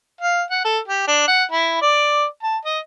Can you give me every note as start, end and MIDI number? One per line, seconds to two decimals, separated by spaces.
0.21 0.43 77
0.51 0.63 78
0.65 0.79 69
0.88 1.07 67
1.08 1.23 62
1.28 1.44 78
1.51 1.79 64
1.82 2.25 74
2.43 2.57 81
2.65 2.79 75